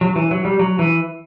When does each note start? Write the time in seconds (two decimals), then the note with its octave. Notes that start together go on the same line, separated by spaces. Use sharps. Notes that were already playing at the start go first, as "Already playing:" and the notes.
0.01 F#3
0.16 E3
0.31 F#3
0.45 G3
0.59 F#3
0.79 E3